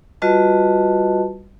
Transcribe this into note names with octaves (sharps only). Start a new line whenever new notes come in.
G3 F4 F#4 B4 D#5 A5